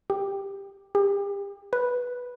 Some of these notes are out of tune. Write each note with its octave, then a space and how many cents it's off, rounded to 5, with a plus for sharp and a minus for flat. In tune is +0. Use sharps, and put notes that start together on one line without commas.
G4 +10
G4 +35
B4 -5